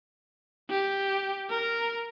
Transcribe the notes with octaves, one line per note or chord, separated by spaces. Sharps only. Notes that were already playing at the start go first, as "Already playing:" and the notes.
G4
A#4